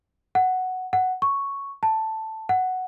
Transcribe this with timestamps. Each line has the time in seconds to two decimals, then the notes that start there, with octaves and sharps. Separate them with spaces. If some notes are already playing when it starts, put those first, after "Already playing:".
0.35 F#5
0.93 F#5
1.22 C#6
1.83 A5
2.49 F#5